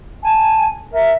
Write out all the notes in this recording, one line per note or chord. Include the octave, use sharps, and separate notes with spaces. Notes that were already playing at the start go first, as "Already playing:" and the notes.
G#5 A5
A#4 E5